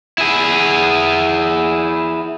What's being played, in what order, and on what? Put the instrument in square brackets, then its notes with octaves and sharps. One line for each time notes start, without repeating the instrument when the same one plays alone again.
[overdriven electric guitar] E4 G#4